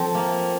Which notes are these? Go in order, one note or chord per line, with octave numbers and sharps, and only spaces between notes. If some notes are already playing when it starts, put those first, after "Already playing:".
Already playing: F3 C4 A4
A#3